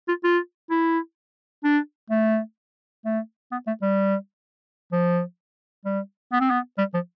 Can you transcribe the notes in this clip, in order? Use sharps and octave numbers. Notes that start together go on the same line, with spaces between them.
F4
F4
E4
D4
A3
A3
B3
A3
G3
F3
G3
B3
C4
B3
G3
F3